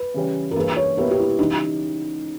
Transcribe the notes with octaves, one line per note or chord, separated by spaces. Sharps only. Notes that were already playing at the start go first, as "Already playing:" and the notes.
Already playing: B4
C#3 E3 G3 C#4
A#4
G2 E3 A#3 C#4 G#4 B4
C#5
B2 G3 A#3 E4 A#4 B4
G4
E4
C#3 E3 G3 D#4